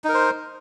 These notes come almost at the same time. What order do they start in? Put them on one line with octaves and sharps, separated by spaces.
D#4 A#4 C5